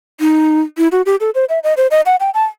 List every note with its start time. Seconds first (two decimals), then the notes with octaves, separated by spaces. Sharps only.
0.20 D#4
0.78 E4
0.92 F#4
1.06 G4
1.20 A4
1.35 C5
1.49 E5
1.64 D#5
1.77 C5
1.91 D#5
2.06 F#5
2.20 G5
2.34 A5